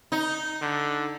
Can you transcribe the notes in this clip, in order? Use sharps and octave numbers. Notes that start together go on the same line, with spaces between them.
D#4
D3